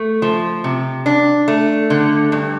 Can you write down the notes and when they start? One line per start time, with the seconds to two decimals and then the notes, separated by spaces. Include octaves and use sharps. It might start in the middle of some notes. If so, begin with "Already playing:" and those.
Already playing: A3
0.22 F3
0.64 C3
1.06 D4
1.48 A3
1.90 D3
2.32 G2